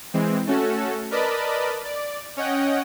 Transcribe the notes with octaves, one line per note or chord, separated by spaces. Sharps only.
E3 G#3 C4
A3 C#4 F#4 A4
A#4 B4 D5 D#5 A5 B5
D5
C#4 C#5 D#5 F#5 G5